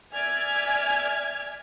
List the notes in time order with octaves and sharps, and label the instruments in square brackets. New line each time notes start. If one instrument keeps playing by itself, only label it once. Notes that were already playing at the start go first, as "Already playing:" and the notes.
[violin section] D5 E5 G#5 F6 G#6